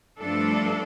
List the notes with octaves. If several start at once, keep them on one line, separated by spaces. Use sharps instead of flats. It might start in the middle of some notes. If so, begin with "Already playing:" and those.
G2 F3 A3 D4 A4